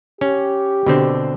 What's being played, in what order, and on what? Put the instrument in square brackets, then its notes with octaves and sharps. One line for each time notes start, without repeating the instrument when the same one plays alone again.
[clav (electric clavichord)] C#4 [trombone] G4
[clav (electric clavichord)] B2 D3 C4